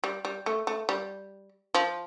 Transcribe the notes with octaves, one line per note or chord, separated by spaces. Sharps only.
G3
G3
A3
A3
G3
F3